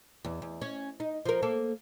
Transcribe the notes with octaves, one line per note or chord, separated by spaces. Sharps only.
E2
E2
C#4
D#4
F3 A#4
A#3 A4